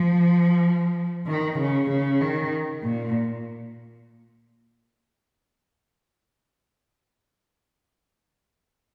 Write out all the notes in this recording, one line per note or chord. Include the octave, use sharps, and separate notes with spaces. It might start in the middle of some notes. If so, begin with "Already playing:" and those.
Already playing: F3
D#3
C#3
C#3
D#3
A#2